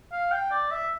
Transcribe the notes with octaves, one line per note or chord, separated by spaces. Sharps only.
F5
G5
D5
E5